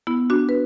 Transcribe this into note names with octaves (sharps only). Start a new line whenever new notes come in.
B3 E4
D4 F#4
B4